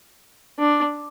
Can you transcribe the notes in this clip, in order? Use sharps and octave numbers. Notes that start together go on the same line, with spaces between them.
D4